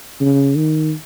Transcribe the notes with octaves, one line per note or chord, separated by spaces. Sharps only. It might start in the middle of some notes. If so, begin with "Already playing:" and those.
C#3
D#3